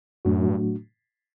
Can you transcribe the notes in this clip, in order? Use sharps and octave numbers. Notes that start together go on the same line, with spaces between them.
F#2 A2 F#3 A3 D4 F#4
G2